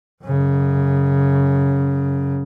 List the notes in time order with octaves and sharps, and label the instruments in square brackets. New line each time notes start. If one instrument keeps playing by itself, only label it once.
[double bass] F#2 C#3